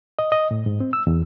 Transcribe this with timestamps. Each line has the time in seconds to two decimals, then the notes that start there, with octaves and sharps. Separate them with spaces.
0.19 D#5
0.32 D#5
0.51 A2
0.66 G#2
0.80 C4
0.93 E6
1.07 E2